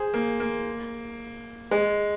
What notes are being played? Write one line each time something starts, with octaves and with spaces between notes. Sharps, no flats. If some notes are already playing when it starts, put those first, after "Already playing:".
Already playing: G#4 C5
A#3
A#3
G#3